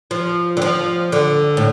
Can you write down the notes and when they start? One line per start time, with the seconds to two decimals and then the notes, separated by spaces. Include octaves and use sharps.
0.11 F3
0.57 D3
0.62 F3
1.12 D3
1.57 A2